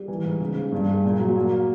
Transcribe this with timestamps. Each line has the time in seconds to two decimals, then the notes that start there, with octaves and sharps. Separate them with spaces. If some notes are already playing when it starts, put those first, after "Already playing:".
Already playing: G3
0.08 E3
0.25 G#2
0.40 C#3
0.56 C#3
0.72 G2
0.88 G#3
1.04 A#2
1.20 F#3
1.36 A#3